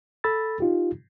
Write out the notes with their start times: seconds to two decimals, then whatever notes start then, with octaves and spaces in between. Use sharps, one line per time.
0.24 A4 B5 E6 A6
0.60 D#4 F4 G4